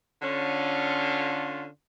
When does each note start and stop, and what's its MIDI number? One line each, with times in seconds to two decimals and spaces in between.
0.22 1.67 50
0.22 1.67 61
0.22 1.67 65